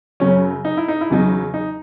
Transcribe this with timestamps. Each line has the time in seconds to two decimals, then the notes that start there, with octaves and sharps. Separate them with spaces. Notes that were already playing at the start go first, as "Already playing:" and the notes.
0.20 F#2 C#3 F#3 C#4
0.65 D#4
0.77 E4
0.88 D#4
1.01 E4
1.10 E2 C#3 F#3 D#4
1.54 D#4